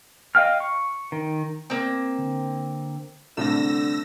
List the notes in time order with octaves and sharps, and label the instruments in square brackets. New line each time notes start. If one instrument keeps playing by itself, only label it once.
[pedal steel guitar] D#5 F5 G5 F6
C#6
D#3
[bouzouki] A#3 C4
[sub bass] D3
[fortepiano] C2 A2 [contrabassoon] D3 [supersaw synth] E6 A#6